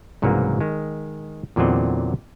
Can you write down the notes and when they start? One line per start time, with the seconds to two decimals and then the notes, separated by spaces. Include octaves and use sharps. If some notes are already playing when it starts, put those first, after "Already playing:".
0.22 C2 G#2 C#3 E3 F#3 A#3
0.61 D#3 G#3
1.56 E2 A#2 D3 F#3 C4 D#5